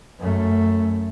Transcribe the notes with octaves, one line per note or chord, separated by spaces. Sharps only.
F#2 A3